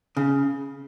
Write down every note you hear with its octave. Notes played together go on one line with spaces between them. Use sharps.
C#3